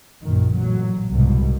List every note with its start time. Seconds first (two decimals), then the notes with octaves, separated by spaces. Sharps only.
0.23 A#1 F#2 D#3
0.54 A1 A#2 F#3
1.10 C2 G#2 B2